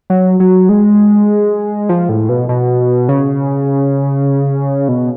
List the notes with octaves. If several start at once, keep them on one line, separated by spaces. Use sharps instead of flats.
F#3
F#3
G#3
F3
A2
B2
B2
C#3
B2